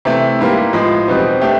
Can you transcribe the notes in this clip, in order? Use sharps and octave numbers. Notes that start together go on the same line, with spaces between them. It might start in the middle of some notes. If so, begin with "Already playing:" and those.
C3 E3 A3
G#2 E3 G3 A#3
A2 F3 G#3
E2 B2 G3 C4 D#4
A3 D4 G4